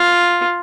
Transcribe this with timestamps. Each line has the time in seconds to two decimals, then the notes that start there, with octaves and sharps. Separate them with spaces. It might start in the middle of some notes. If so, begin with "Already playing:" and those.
Already playing: F4